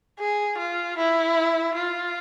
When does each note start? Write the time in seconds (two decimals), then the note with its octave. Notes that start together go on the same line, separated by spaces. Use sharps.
0.19 G#4
0.58 F4
0.97 E4
1.75 F4